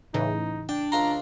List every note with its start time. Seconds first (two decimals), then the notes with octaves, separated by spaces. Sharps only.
0.14 A2 C#3 E3 D#4
0.69 D4 G5
0.92 C#2 F4 A#5 C6